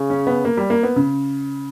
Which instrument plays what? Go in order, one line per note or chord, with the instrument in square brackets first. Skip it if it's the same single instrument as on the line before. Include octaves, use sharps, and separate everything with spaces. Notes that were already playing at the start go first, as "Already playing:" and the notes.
Already playing: [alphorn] C#3
[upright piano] C#4
B3
A#3
G3
A#3
B3
C#3